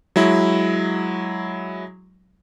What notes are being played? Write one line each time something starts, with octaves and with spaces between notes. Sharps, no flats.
F#3 G#3 E4